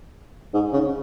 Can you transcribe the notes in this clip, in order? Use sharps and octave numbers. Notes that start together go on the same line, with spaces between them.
G#2
C#3